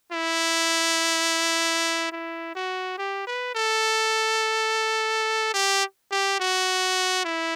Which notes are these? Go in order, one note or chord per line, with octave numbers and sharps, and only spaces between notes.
E4
E4
F#4
G4
B4
A4
G4
G4
F#4
E4